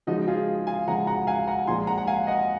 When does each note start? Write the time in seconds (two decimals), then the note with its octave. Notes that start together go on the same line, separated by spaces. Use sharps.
0.07 C#3 F3 G#3 D#4 F#4
0.27 F4 G#4
0.67 F5 G#5
0.87 C#3 F3 G#3 F#5 A#5
1.07 F#5 A#5
1.27 F5 G#5
1.47 F#5 A#5
1.67 A#2 F3 G#3 G#5 C6
1.87 F#5 A#5
1.98 F#5
2.07 F5 G#5
2.27 D#5 F#5